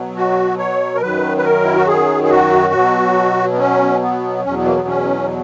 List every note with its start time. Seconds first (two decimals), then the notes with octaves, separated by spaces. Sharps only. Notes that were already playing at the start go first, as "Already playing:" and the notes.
Already playing: B2 F#3
0.16 F#4
0.58 C#5
0.95 A#4
1.01 F#2 D#3 F#3 B4
1.37 B4
1.44 A#4
1.64 E4
1.76 F#4
1.87 G#4
2.24 G#4
2.30 F#4
2.73 B2 F#3
3.53 B3
3.59 C#4
4.02 B3
4.44 E2 B2 F#3 C#4
4.56 B3
4.66 A#3
4.76 B3
4.88 C#4